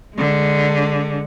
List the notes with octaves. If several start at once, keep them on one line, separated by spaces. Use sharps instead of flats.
D3 G#3